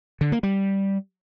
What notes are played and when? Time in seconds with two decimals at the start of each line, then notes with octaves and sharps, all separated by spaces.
0.21 D3
0.32 A#3
0.43 G3